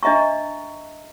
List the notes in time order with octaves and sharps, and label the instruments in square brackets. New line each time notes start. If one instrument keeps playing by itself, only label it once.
[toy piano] D4 D#5 E5 A#5 C#6